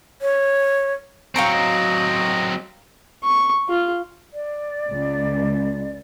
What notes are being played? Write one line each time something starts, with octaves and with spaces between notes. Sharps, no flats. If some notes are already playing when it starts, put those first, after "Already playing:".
C#5
F#3 C4 F5 G5 A#5 C#6
D#5
C#6
F4
D5
C#2